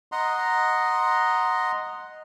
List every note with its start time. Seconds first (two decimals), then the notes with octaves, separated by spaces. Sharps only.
0.12 D#5 F#5 A#5 C6